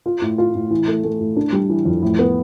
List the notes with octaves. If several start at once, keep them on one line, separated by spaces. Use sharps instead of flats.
F4
A2
F4
A2
E3
A3
A3
A2
D4
G3
E3
F2
A2
B3